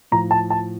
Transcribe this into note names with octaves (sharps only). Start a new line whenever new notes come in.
A2 F3 A#5
A5
A5